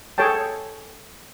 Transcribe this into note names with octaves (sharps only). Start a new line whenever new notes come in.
G#4 A4 C#5 G5 A5